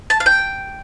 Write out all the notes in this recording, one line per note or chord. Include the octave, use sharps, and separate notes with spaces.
A5
F5
G5